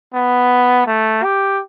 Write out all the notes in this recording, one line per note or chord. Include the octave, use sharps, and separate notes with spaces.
B3
A3
G4